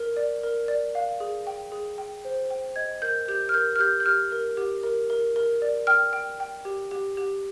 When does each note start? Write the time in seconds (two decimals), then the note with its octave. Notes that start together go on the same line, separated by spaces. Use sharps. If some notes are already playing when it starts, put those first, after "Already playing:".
Already playing: A#4
0.17 D5
0.43 A#4
0.68 D5
0.95 F5
1.20 G#4
1.47 G5
1.72 G#4
1.98 G5
2.25 C5
2.50 G5
2.76 D#5 G#6
3.02 A#4 G6
3.28 G4 G6
3.49 F6
3.54 A#4 G6
3.76 F6
3.79 G4 G6
4.00 G6
4.06 G4 F6
4.32 A#4
4.57 G4
4.83 A#4
5.10 A#4
5.36 A#4
5.62 D5
5.87 G5 F6
6.13 G5
6.40 G5
6.65 G4
6.91 G4
7.17 G4